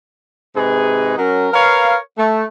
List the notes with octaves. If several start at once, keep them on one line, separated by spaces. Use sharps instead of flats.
G#2 C3 D#4 G#4 B4
F#3 C#4 A#4
A#4 B4 C#5 F5
A3